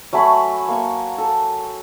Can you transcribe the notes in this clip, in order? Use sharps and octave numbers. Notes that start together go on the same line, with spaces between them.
F#3 A3 G#5 B5
A#3 C#6
A4